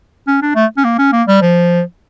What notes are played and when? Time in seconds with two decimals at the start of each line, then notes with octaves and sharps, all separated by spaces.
0.27 C#4
0.42 D4
0.56 A3
0.77 C#4
0.84 A#3
0.98 C#4
1.12 A#3
1.28 G3
1.42 F3